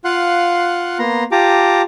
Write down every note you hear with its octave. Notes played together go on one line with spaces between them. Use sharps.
F4 F5 F#5 C6 F#6
A#3 B3 A#5 C6
F4 G4 A5 A#5 D6